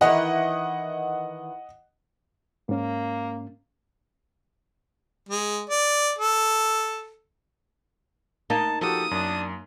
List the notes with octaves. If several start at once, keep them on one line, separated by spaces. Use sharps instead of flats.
D#3 E3 E4 D#5 F#5
G#2 A#3 C#4
G#3
D5
A4
A#3 D#4 A5
F3 F#4 G4 A4 D#6
F#2 D4